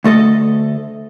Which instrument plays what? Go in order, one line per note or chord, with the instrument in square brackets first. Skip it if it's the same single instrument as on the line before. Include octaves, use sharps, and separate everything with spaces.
[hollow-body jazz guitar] D2 A3 A4 D#5